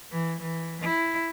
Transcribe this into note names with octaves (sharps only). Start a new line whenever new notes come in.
E3
E3
E4